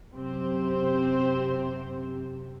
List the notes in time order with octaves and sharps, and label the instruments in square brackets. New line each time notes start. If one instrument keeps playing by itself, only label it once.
[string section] F#2 C3 [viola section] C4 G4 C5